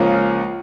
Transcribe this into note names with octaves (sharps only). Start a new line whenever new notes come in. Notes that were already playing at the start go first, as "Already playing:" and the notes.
Already playing: C#2 C#3 F3 A#3